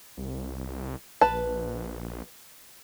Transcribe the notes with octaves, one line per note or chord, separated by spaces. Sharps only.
C2
A#1 B4 A5